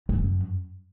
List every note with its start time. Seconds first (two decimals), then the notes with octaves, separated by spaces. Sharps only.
0.09 F#2